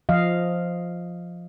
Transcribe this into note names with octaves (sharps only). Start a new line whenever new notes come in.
F3 D#5 F5